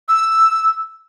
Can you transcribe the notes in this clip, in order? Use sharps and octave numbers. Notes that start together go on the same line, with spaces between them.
E6